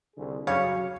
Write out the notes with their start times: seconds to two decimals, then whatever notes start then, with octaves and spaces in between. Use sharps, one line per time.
0.16 C2 D3 G#4
0.47 C#3 F#3 G3 C#4 C#5 F5